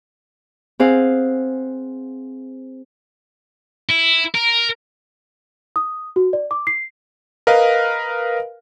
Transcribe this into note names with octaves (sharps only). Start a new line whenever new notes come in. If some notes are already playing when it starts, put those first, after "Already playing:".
C4 G#4 C5 F5 F#5
E4
A#4
D#6
F#4
D5
D6
C7
A#4 B4 D#5 F5